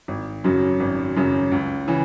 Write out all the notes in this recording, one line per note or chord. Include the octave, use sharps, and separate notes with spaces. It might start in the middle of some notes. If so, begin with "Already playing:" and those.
G#1
F#2 C#3 F#3
G#1
F#2 C#3 F#3
C#2
C#3 E3